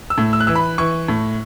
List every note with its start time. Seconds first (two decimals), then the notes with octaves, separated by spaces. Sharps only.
0.10 E6
0.18 A2
0.33 E6
0.40 F#6
0.47 E3 E6
0.55 B5
0.78 E3 C#6
1.08 A2